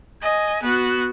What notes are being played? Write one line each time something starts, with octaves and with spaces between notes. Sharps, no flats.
D#5 G#5
B3 F#4